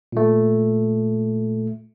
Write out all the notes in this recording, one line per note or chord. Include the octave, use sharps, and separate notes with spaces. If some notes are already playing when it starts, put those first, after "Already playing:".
A#2 A3